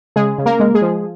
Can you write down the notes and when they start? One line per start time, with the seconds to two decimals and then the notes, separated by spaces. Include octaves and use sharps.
0.16 C#3 G#3 G#4
0.38 C#3
0.46 A#3 A#4
0.60 G#3
0.74 G#3 G#4
0.82 F3